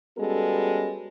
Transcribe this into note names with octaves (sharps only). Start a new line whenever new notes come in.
G3 G#3 B3 C#4 F#4 A4